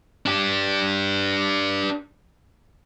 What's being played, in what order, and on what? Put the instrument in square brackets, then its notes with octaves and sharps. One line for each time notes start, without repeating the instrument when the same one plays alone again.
[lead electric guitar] D4 G4